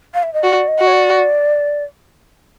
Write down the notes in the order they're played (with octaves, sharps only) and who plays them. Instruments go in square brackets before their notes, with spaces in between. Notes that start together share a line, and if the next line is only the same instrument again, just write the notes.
[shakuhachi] F5
E5
D#5
[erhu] F#4 [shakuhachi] D5
[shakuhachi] D#5
[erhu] F#4
[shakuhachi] C#5
D5